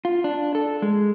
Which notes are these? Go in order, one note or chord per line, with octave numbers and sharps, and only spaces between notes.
F4
D4
A4
G#3